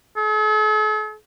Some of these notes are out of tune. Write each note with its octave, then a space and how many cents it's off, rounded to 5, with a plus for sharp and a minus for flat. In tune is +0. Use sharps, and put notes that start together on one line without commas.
A4 -45